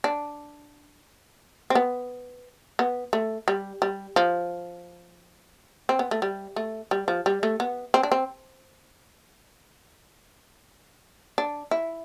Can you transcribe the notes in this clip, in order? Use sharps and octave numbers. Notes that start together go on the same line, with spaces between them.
D4
C4
B3
B3
A3
G3
G3
F3
C4
B3
A3
G3
A3
G3
F3
G3
A3
B3
C4
D4
C4
D4
E4